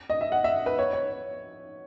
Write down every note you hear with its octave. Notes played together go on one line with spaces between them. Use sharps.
D#5
E5
F#5
E5
B4
C#5
C#5